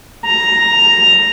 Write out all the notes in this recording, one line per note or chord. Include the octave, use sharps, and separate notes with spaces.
A#5